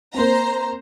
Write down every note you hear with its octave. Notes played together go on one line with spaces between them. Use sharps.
A#3 C4 C5 A#5